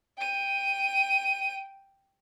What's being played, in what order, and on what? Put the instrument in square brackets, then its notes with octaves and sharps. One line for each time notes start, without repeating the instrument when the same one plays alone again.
[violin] G5 D#7